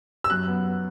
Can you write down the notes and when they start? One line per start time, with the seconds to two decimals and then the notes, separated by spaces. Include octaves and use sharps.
0.24 E6
0.30 F#2 F#6
0.48 B3
0.66 B3